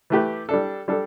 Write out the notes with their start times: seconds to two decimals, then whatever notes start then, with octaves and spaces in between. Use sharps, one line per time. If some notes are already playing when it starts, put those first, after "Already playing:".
0.10 E3 A3 G4 B4
0.49 G3 D4 A4
0.88 G3 D4 A4